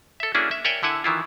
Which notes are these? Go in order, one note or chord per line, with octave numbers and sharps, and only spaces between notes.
A4 E5
A#3 C#4 D4 E4 F#4 G#4
E5
A#4 C#5 D5 E5 G5 G#5
D3 E4 F#5 G#5
D#3 E3 E4 F4